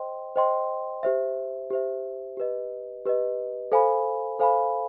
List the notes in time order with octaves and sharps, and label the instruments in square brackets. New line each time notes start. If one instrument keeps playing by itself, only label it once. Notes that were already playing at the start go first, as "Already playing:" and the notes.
Already playing: [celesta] C5 D#5 G5 C6
C5 D#5 G5 C6
G4 C5 E5
G4 C5 E5
G4 B4 D#5
G4 B4 D#5
A4 C5 F5 G#5 B5
A4 C5 F5 G#5 B5